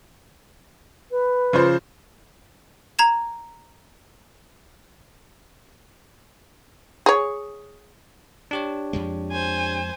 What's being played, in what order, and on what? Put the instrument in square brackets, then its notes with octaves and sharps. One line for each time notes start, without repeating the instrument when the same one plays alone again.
[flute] B4
[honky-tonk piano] C#3 F3 C5
[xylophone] A#5 G#6 E7
[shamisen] G#4 C#5
[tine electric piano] D4 G4 C#5
[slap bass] F2 F3 G#3
[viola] C5 G#5